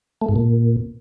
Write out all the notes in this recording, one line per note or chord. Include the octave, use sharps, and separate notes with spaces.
A3
G#2
A#2